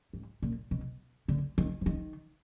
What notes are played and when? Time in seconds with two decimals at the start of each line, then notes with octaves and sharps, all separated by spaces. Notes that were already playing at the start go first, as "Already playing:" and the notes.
0.13 G#2
0.43 A#2
0.71 B2
1.28 D3
1.58 D#3
1.81 F3
1.86 D#3